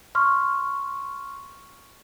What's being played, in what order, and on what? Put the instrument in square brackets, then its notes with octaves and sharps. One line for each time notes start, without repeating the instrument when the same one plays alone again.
[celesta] C6 C#6 F6